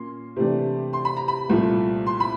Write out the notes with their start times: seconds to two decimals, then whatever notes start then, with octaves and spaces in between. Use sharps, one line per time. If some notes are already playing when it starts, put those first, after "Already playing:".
Already playing: A#2 A#3 C#4 C6
0.36 C3 E3 A3 D4
0.93 C6
1.05 B5
1.17 A#5
1.28 B5
1.50 C2 A#2 F3 A3
2.06 C6
2.20 B5